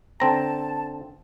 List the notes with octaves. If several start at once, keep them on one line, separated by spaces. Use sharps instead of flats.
D3 C4 A5 A#5